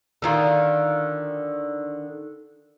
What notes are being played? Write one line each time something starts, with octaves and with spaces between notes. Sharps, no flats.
D3 D#3 F4